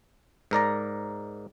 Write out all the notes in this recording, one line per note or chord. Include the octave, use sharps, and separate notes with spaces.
G#2 A#4 D5 A#5